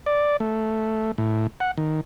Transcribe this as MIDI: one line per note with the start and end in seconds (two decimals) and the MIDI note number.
0.06 0.37 74
0.40 1.11 57
1.18 1.47 45
1.60 1.71 78
1.78 2.01 51